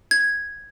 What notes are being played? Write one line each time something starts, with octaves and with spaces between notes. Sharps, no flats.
G#6